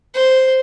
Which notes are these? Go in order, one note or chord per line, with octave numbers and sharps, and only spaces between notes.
C5